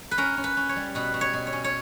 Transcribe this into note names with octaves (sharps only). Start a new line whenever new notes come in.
B4
C#4 A#4
C#4
B4
C#4
C#5
G3
B2 B4
B2
C#5
B2
C#5
C#4
C#5